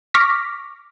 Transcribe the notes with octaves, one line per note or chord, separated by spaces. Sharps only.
C#6 D6 F6 A#6 B6